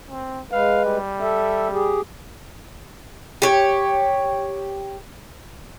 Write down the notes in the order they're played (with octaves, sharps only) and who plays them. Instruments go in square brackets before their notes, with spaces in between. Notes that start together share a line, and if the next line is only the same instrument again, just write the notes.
[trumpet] C4
[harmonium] G#3 B4 [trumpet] F5
[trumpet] G3
[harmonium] A4 E5
G4 G#4
[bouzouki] G4 C#5